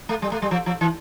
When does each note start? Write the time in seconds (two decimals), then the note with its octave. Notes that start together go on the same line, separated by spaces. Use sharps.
0.09 A3
0.22 G3
0.32 A3
0.42 G3
0.51 F3
0.66 F3
0.81 E3